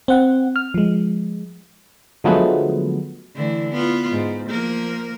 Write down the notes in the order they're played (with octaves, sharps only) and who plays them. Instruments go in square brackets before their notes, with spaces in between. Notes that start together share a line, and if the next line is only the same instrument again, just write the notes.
[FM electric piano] C4 F#5
F6
F3 G#3
D3 F3 F#3 G#3 A3 B3
[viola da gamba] D3 E3 A3
B3 F4
G#2
F3 A#3 A#4